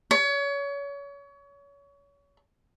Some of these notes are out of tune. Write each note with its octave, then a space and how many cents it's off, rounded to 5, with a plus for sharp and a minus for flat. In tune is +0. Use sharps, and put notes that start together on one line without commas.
C#5 +30